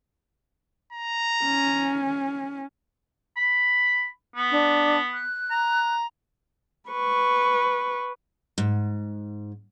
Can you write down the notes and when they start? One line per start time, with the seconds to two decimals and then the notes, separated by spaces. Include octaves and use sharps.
0.93 A#5
1.44 C#4
3.37 B5
4.36 B3
4.50 D4
5.13 F#6
5.51 A#5
6.90 B4 C#6
8.58 G#2